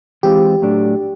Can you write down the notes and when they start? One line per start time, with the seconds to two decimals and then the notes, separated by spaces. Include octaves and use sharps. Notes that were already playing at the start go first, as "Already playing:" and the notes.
0.23 E3 G#3 C4 F4 G4
0.62 A2 F#3 A3 D4